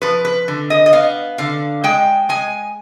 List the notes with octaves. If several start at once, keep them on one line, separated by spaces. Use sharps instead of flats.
F3 B4
B4
D3
D#5
D#5
B3 F5
D3 F5
G#3 G5
G#3 G#5